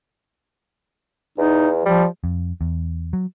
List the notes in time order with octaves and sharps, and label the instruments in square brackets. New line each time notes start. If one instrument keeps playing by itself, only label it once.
[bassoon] E2 [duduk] D#4
[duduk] F3 [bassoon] G3
[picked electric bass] F2
E2
F#3